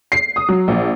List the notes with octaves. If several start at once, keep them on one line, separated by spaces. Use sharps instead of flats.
C7
D#6
F#3
A#1